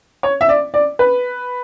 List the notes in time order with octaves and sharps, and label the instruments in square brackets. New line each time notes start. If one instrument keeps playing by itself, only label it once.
[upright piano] C#5
E5
D5
D5
B4